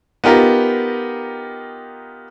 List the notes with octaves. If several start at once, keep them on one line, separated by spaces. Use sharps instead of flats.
B3 D#4 F4 G4 A#4